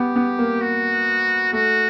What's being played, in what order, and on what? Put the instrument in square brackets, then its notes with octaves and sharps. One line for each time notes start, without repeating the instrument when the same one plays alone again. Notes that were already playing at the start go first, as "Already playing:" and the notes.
Already playing: [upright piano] B3 [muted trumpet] G4
[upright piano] B3
A#3
[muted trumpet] F#4
[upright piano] A3 [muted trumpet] F#4